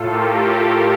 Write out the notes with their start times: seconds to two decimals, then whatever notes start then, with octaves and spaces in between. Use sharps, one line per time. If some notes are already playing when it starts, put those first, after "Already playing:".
Already playing: A2 A3 F4 A4
0.10 G4 A#4
0.41 G4